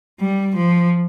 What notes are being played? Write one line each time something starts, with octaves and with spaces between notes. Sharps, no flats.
G3
F3